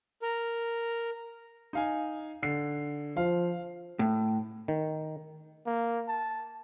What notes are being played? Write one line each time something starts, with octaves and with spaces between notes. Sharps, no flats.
A#4
D#4 F5 G#5
D3 C7
F3 F5
A2
D#3
A#3
A5